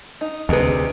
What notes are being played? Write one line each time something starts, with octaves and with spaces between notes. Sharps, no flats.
D#4
D2 C3 D#3 G#4 B4